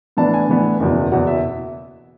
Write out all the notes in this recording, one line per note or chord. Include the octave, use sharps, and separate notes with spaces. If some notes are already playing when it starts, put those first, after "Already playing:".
A2 E3 B3 D4 A5
G#5
A2 E3 B3 D4
F#1 E2 B2
F#1 E2 B2 F#5
E5